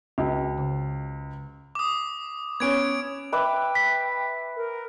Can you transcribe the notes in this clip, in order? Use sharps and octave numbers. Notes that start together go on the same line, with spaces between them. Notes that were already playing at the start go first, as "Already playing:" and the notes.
C#2 F#4
C#3
D6 D#6
B3 C#4 G#6 D7
B4 E5 G5 D6
B6
A#4